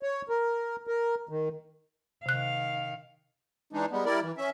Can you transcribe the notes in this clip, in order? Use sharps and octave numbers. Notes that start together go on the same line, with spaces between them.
C#5
A#4
A#4
D#3
C3 D#3 F5 F#6
E3 G#3 D4 D#4
G3 G#3 B3
G3 E4 A#4 D5
E3
C#4 E5